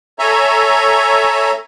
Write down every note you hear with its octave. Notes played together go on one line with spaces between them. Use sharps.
A4 C#5 E5 G#5 A#5